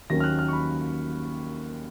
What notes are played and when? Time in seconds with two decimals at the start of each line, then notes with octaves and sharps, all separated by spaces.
0.10 D#2 D#3 F#3 A#3 C#4 A#6
0.20 F6
0.24 F#6
0.39 F6
0.48 C#6
0.53 B5